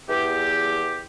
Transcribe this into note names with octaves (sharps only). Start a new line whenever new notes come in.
E2 G4